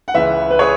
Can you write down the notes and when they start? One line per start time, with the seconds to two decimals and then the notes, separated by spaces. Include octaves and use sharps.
0.08 F#5
0.14 C#2 C#3 E3 B4 E5
0.50 B4
0.59 G#4 C#5